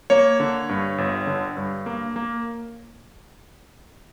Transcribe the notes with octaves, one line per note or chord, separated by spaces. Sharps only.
A#3 C#5
D3
G2
G1
D3
G2
A#3
A#3